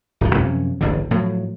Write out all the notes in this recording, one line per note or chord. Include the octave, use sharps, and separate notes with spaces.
D1 G#1 F3
F#2 C3 F3 C#4
D1 A1 G2 D3
A2 F3 F#3